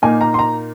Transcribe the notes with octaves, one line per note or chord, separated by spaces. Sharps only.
A#2 A#3 D#4 G#5
A#5
C6
A#5